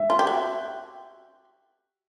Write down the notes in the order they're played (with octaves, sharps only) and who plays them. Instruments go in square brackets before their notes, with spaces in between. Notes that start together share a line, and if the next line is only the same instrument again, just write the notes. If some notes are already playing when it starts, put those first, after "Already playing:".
Already playing: [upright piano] E5
[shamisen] F4
G4
F#4